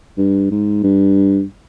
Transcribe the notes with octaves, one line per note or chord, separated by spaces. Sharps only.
G2
G#2
G2